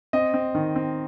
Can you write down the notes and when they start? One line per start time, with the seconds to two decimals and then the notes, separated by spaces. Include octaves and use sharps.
0.13 C4 D#5
0.34 C4
0.55 D#3
0.76 C4